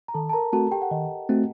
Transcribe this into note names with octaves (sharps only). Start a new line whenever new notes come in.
A#5
D#3 A4 A5
A5
A#4 A#5
A3 C4 F#4 A4 A5
G4 G5
F#5
D#3 D#5
A3 C4 F#4